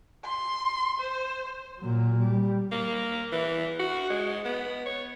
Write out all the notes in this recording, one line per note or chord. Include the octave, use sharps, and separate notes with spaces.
C6
C5
A#2 F#3
G3
A#3
E3
F#4
G#3
B3
C#5